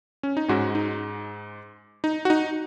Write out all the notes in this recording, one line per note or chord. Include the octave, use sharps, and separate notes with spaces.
C#4
D#4
G#2 G#3 C#4 F#4
D#4
D#4
F#4
D#4